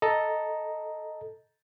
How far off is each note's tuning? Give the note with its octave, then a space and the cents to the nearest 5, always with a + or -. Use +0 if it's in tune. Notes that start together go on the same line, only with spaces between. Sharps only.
A4 +0 D#5 +0 A#5 +0